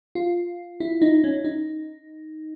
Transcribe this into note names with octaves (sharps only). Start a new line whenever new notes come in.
F4
E4
D#4
C#4
D#4